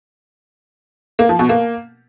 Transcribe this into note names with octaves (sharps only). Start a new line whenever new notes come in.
A#3
F3
B2
A#3